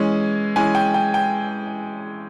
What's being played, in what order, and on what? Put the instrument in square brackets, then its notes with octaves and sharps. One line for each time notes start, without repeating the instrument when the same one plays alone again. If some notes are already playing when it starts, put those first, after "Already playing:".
Already playing: [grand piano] E3 G#3 C#4
E3 G#3 C#4 G#5
G5
G5
G5